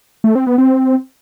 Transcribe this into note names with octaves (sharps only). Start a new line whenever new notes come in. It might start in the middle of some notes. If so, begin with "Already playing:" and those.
A3
C4
B3
C4